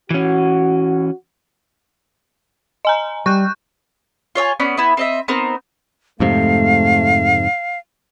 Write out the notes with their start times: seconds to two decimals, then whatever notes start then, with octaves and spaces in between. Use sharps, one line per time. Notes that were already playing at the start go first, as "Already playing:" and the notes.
0.10 E3 C#4 F#4
2.85 D#5 G#5 A#5
3.26 G3 C#6 F#6 G6
4.35 F4 C#5 E5 G#5
4.60 B3 C#4 D5
4.77 B3 E4
4.97 C4 D#5 E5
5.28 B3 C4 D#4 A#4
6.20 F2 G#2 C3 A3 F5